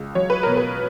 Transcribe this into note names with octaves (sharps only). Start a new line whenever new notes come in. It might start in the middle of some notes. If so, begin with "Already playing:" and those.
Already playing: C#2
F#3 C#5
B4
B2 A#4
B4